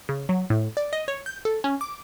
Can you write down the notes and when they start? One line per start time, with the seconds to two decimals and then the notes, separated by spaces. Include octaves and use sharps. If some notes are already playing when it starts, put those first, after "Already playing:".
0.09 C#3
0.29 F#3
0.50 A2
0.77 D5
0.93 D#5
1.08 C#5
1.26 G6
1.45 A4
1.64 C#4
1.81 D6